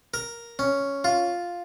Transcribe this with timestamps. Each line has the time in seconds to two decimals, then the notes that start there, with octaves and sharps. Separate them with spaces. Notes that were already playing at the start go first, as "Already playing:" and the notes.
0.14 A#4
0.59 C#4
1.04 F4